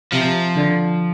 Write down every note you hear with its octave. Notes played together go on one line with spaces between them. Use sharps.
C3 F3
D3